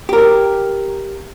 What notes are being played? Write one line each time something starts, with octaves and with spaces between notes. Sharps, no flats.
G4 A#4